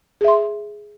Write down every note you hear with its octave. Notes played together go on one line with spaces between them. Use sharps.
G#4 E5 C6